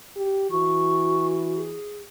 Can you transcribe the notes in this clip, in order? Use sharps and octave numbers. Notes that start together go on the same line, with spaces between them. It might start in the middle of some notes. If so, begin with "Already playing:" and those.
G4
E3 F#4 C#6
G#4